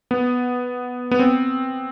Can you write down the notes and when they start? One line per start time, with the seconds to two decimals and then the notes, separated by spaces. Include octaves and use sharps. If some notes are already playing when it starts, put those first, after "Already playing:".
0.11 B3
1.11 B3
1.19 C4